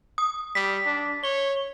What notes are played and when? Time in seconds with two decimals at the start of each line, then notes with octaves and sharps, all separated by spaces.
0.18 D#6
0.55 G3 B6
0.86 D4
1.24 C#5 G7